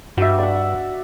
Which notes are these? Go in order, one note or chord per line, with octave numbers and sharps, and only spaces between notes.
G2 F#4 E5
D5 F#5